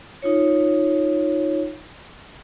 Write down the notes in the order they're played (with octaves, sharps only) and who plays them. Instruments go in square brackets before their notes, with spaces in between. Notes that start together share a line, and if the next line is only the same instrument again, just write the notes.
[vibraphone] D#4 F4 C#5